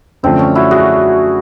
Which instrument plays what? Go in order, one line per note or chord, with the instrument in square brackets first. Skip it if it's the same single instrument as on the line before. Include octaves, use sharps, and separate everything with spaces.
[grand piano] F#2 D3 F3 A3 D4 [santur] C4
[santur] C#4
E4 F#4
F#4 G#4